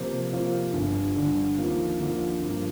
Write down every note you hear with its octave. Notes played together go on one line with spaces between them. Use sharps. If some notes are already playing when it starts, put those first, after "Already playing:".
Already playing: C3 F3 A#3 F4 C5
C3 F3 A#3 F4 C5
G1 G2 D3
G1 G2 D3
D#2 D3 F3 A#3 F4
D#2 D3 F3 A#3 F4
G2 F3 A#3